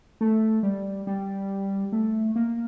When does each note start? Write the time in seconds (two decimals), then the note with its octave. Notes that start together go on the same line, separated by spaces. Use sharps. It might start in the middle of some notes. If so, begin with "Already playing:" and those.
0.21 A3
0.63 G3
1.07 G3
1.92 A3
2.36 A#3